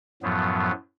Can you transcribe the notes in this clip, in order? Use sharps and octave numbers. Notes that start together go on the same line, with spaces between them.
F#2 A2 F3 F#3 B3